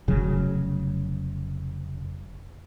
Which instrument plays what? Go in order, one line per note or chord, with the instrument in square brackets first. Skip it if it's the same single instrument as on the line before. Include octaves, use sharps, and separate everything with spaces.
[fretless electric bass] F1 C#3 F#3